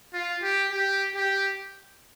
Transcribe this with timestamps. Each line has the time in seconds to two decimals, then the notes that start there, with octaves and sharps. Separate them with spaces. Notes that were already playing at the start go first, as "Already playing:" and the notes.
0.13 F4
0.42 G4
0.71 G4
1.16 G4